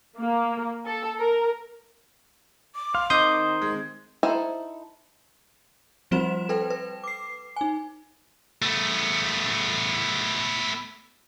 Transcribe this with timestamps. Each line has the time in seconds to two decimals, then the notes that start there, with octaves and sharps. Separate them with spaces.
0.19 A#3
0.86 A4
1.19 A#4
2.75 D6
2.95 F5 C6
3.10 D#3 C4 D#4 C5 D#5 C6 D#6 G6
3.62 G#3 G#6
4.23 D#4 E4 A4 C5
6.11 F3 G3 C4 F#4 C5 E7
6.49 A4 B4 G5
6.70 B4
7.04 D6 C7
7.56 D#4 G#5
8.62 A3 B3